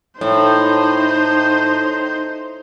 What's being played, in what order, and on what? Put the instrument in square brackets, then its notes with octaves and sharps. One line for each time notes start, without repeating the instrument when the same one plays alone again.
[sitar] A2 [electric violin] D#4 C5